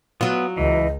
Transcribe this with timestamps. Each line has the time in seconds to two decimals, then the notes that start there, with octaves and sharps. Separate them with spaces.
0.21 F#3 B3 F4
0.57 C#2 E3 D#5